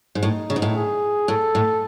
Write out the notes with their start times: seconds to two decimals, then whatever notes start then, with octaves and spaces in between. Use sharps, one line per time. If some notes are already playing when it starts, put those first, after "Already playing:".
0.15 G#2
0.23 A2 D#4
0.50 C#3
0.56 G#2
0.62 A2
0.76 G#4
1.28 A2 A4
1.55 A2